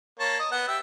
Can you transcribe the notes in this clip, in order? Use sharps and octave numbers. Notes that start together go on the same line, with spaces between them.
A#3 C#5 A5
D#5
B3 F#5
G4 E5 E6